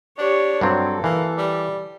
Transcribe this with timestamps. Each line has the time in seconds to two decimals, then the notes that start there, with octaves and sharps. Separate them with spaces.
0.18 D4 G4 C#5
0.61 G2 F#3 C4 A4
1.04 E3 A#3
1.37 G3